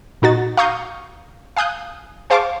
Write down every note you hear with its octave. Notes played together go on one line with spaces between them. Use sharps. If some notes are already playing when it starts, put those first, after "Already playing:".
A#2 D#4 F#4 A6
F5 A#5 C#6 D#6 G6
F5 G#5 D#6 F#6 G6
G#4 C5 F5 A5 C#6 D6